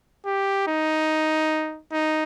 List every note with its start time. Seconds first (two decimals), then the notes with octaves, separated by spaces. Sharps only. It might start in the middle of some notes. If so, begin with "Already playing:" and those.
0.25 G4
0.67 D#4
1.92 D#4